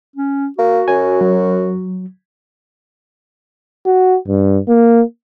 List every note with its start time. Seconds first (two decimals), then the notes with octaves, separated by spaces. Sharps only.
0.16 C#4
0.59 A#3 F#4
0.88 F#2 G#5
1.21 F#3
3.86 F#4
4.28 G2
4.68 A#3